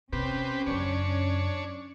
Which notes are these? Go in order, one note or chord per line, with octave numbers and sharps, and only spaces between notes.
C3 C4 C#4 G4 B4
F#2 C#3 D4 C#5